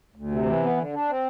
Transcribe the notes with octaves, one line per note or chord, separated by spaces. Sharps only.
D2
C3
E3
B3
D3
D4
C4